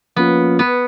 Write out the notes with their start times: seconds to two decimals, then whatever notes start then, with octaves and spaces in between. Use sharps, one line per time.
0.16 F3 A#3 B3 C#4 F4
0.59 B3